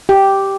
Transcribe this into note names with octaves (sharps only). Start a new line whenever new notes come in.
G4